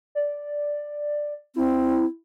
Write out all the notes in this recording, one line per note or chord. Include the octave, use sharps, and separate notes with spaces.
D5
C4 E4